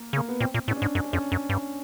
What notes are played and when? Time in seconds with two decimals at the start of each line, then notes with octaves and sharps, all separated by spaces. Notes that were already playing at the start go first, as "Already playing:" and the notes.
Already playing: A#3
0.13 C#3
0.17 A#3
0.29 B3
0.40 A#2 C4
0.54 A#2
0.68 A2
0.71 C#4
0.77 D4
0.82 G#2
0.95 F#2 C#4
1.04 D4
1.13 F2 C#4
1.32 F#2
1.50 G2